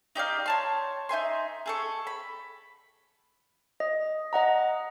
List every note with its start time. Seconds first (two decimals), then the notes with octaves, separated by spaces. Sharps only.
0.15 D#4 G4 D5 F5
0.46 C#5 A5 C6
1.09 D#4 E5 G#5 C6
1.66 G#4 A4 C#6
2.07 B5
3.80 D#5
4.33 D#5 F#5 A#5